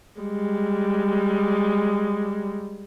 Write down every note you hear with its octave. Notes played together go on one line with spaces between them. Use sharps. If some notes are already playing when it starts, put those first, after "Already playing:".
G3 G#3